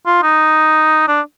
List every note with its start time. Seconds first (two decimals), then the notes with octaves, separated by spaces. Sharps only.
0.06 F4
0.23 D#4
1.08 D4